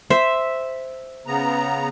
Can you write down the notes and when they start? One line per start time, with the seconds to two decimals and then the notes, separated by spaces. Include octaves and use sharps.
0.10 C5 E5
1.27 C#3 B3 A#5